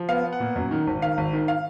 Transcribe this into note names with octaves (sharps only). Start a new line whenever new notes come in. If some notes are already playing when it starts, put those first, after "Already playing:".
Already playing: F3
B3 F5
B3
F#5
A#2
F#2
D#3
G#1
D#3 F5
G#1
D#3
F5